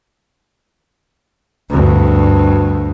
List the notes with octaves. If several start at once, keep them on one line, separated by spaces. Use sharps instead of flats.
D2 G2